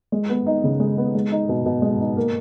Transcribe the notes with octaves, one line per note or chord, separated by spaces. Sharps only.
G#3
B3
D#4
C#3
G#3
B3
G#3
D#4
B2
B2
G#3
D#4
A#3